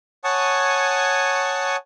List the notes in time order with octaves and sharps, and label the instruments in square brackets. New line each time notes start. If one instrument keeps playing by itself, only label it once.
[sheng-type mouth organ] C#5 F#5 G#5 A5 C#6 D#6